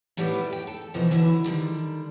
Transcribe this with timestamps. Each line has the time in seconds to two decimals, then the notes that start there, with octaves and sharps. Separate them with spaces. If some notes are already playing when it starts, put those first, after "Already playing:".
0.17 A2 G3 A3 B3 E4 G4
0.53 G5
0.67 A4
0.94 B2 E3 F3 B3 D#4
1.11 D3 E3 F#3 E4
1.44 D3 D#3 G3